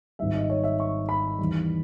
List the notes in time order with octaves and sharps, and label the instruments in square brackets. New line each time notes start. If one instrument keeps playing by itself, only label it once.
[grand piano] G#1 G#2 D#3 G3 E5
D#5
C#5
E5
C#6
B5
E2 D#3 G3